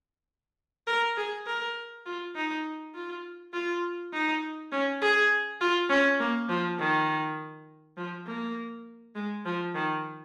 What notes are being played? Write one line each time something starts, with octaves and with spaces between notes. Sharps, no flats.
A#4
G#4
A#4
F4
D#4
F4
F4
D#4
C#4
G#4
F4
C#4
A#3
F3
D#3
F3
A#3
G#3
F3
D#3